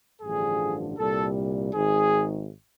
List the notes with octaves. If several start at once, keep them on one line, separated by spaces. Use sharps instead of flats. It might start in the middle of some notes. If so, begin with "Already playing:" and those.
A1 G2 D3 F3 G#4
C2 A#2 G3 A4
G#1 G#2 D#3 G#4